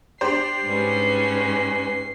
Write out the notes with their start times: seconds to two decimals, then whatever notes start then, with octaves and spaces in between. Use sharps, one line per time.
0.21 D4 G4 C5 C7
0.64 G#2 G3 C#4 B4